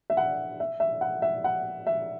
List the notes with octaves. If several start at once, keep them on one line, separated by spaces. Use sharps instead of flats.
E5
F#5
E5
E5
F#5
E5
F#5
E5